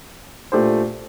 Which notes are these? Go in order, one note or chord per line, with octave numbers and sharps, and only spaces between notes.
A#2 A3 D4 G4 C5